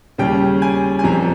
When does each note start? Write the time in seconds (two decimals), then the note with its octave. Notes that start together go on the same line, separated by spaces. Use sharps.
0.18 D#2 C#3 G3 C#4 G5
0.62 G#5
0.99 G#5
1.03 F1 F2 C3 A#5